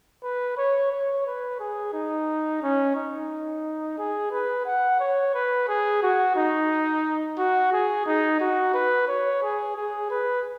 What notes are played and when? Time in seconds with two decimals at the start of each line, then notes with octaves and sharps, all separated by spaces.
0.24 B4
0.58 C#5
0.92 C#5
1.27 B4
1.60 G#4
1.94 D#4
2.63 C#4
2.96 D#4
3.99 G#4
4.32 B4
4.66 F#5
5.00 C#5
5.34 B4
5.68 G#4
6.03 F#4
6.36 D#4
7.38 F#4
7.73 G#4
8.06 D#4
8.40 F#4
8.74 B4
9.08 C#5
9.43 G#4
9.76 G#4
10.11 B4